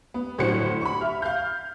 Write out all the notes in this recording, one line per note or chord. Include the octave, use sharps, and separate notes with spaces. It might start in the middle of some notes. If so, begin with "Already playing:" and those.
B3
G1 A2 F#3 C5 F#5 C#7
B5 C#6
E5 F6
F5 F6 G6